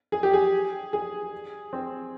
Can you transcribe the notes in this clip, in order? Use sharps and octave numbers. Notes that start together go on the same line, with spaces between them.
G#4
G4
G#4
G#4
C4